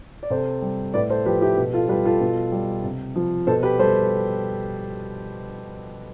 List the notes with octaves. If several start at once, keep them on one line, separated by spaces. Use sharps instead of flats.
D5
C3 A4 C5
G3
A2 B4 D5
A4 C5
F3 G4 B4
E4 G4
B2
F4 A4
G3 G4 B4
F4 A4
B2
G3
C3
F3
B2 A4 C5
G4 B4
G3 A4 C5